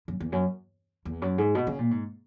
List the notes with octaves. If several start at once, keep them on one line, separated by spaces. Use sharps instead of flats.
F#2
E2
F#2
E2
F#2
G#2
B2
C#3
A#2
G#2